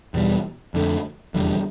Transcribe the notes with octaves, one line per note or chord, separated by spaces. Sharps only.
E2 B2 G3
F2 D3 A3
F1 E2 D3 G3